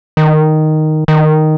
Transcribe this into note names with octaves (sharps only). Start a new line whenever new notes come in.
D#3
D#3